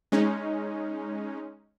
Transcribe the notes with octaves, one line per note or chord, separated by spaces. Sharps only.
G#3 C#4 D#4